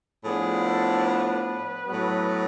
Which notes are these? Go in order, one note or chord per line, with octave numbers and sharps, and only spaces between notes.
A2 F3 B3 D4 G#4
A4
B4
A2 F#3 B3